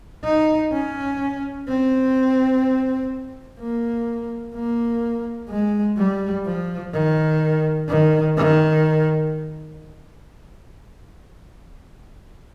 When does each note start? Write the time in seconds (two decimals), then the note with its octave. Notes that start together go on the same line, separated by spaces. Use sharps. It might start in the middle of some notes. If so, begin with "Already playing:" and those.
0.25 D#4
0.73 C#4
1.69 C4
3.60 A#3
4.55 A#3
5.50 G#3
5.98 G3
6.45 F3
6.93 D#3
7.88 D#3
8.37 D#3